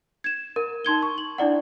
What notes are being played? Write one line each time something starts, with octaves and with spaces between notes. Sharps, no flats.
G#6 E7
A#4
D#4 C6 G#6 G7
C#6
F#7
D4 E4 D5 F#5